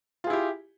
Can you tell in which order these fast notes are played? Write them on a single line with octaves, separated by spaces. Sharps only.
F4 G#4 E4 G4